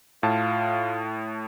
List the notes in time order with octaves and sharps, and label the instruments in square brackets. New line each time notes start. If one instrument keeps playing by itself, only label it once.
[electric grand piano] A2 A5 [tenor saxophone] F4